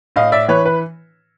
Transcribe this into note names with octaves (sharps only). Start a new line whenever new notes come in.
A2 D#5 F5
D5 E5
E3 B4 C#5
B4